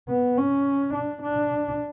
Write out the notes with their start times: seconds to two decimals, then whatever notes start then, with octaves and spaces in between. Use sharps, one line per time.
0.09 B3
0.38 C#4
0.94 D4
1.23 D4